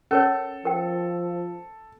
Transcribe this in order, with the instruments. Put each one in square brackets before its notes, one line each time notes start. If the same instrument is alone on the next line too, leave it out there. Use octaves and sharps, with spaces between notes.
[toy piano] C#4 A#4 C#5 [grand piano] A4
[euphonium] F3 [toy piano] A#4 G5